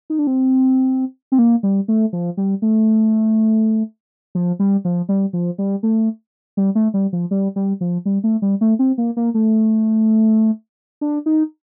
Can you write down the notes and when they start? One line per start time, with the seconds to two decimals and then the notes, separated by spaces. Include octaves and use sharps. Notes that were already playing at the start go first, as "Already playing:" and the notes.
0.10 D#4
0.19 D4
0.27 C4
1.32 C4
1.38 A#3
1.63 G3
1.88 A3
2.13 F3
2.37 G3
2.62 A3
4.35 F3
4.59 G3
4.85 F3
5.09 G3
5.33 F3
5.58 G3
5.83 A3
6.57 G3
6.75 A3
6.94 G3
7.13 F3
7.31 G3
7.56 G3
7.81 F3
8.06 G3
8.24 A3
8.42 G3
8.61 A3
8.79 C4
8.98 A#3
9.17 A#3
9.34 A3
11.01 D4
11.26 D#4